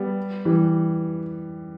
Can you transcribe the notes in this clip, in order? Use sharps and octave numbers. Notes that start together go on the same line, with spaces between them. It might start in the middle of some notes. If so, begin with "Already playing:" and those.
Already playing: G3 B3
E3 G3